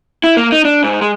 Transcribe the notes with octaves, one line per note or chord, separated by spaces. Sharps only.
E4
A#3
D#4
D4
G#2
G#3